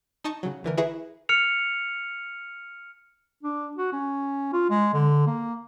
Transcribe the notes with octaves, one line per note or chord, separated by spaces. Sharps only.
D#4 D#5 A5 C#6 D#6
C#3 F#3
A1 D3 E3 A#4
E4 G#4 B4 E5 A#5 C#6
F6 C#7 F7
D4
F#4
C#4
F4
G#3
D3
A#3